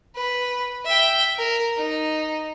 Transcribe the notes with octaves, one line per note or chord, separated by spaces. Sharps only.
B4
E5 G5
A#4
D#4